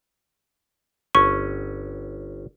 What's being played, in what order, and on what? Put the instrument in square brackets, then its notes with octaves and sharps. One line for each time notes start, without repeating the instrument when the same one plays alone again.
[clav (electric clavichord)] G1 C#4 [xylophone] C#6